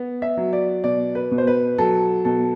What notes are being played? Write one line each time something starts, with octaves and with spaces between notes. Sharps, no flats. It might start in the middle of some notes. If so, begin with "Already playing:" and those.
Already playing: B3
E5
F#3
D5
B2 D5
B4
B2
C5
B4
F#3 A4
B2 A4